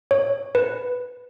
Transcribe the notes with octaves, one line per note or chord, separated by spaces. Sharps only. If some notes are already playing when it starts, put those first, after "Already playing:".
C#5
B4